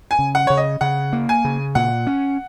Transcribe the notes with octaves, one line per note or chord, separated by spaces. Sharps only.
G#5
C#3
F#5
C#3 C#5
D#5
C#3 F#5
A#3
G#5
C#3
A#2 F#5
C#4